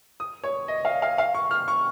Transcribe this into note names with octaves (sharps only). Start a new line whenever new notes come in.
D#6
C#5
D#5
F5
F5
F5
C#6
F6
C#6